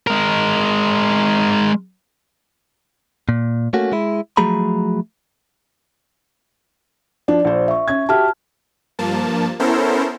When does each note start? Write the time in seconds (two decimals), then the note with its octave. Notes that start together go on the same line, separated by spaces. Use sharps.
0.07 G#3 A#4
3.29 A#2
3.73 A3 A#3 C#4 F#4
3.92 G#3 E4
4.37 F3 F#3 A3 G#4 A#5 B5
7.28 F3 D4 D5
7.45 A#1 C5
7.68 E5 C#6
7.88 C#4 G#6
8.09 F#4 G4 E5 A5 F6
8.99 G2 F3 A#3 A5
9.59 B3 C#4 E4 A4 A#4 C5